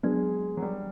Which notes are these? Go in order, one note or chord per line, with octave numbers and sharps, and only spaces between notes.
F#3 G#3 B3 D4
F#3
G3